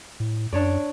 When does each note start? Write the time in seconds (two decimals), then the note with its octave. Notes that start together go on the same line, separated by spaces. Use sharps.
0.20 A2
0.53 F#2 D4 C#5 D5